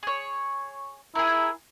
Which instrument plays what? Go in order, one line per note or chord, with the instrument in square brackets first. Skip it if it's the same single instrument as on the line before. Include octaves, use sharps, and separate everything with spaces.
[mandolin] G#4 C#5
[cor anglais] E4 [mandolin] G#4 A#4